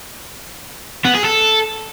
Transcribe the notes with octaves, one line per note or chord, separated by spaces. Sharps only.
B3
G#4
A4